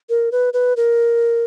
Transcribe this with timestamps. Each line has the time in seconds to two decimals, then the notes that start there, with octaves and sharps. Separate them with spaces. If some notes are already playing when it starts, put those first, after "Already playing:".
0.09 A#4
0.32 B4
0.53 B4
0.77 A#4